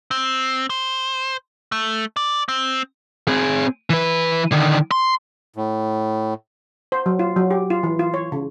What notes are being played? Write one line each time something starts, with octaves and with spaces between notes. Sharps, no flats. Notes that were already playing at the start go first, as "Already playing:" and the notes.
C4
C5
A3
D5
C4
C4 G#4
E3 B4
D3 D#3
C6
A2
C5
F#3
F4
F#3
G4
F4
E3
F4
C#5
C#3